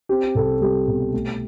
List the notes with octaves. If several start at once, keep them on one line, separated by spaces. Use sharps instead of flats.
C4 G4
C2 A4
G3 G4
B2
A3